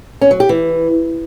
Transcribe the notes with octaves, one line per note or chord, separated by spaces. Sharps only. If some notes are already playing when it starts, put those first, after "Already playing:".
C#4
F#3
G4
E3